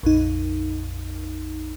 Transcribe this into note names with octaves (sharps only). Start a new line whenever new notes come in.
A#1 F2 D#4